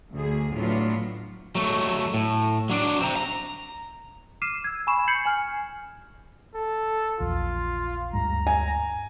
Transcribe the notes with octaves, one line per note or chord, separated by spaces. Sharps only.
D2 G#4
A2 F#3 B3 D4 F4
F#3 A3
A2
F#3 D4
C4 A#5
A#5
D6 F6 C7 D#7 E7
E6 G#6
G#5 B5 C#6 E7
G6 G#6 C7 C#7 F#7
G#5 F6
A4
A#1 E2 F4
D2 G2 G#3 A#5
G#5